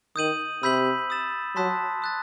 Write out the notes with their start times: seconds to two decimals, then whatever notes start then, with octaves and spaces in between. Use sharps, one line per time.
0.16 D#3 D#6 G6 D#7 F#7
0.63 C3 B5 E6 G6 B6 F#7
1.10 D#6 A6 E7
1.56 F#3 A5 C6 D#6 F#6 B6
2.02 D#6 F#6 A6